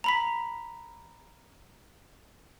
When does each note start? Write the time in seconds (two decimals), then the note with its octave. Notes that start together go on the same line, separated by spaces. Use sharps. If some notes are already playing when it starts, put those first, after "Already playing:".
0.04 A#5 B5 B6